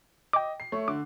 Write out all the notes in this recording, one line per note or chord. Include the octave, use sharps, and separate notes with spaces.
D#5 G5 D6
C7
A3 C#5
D3 D6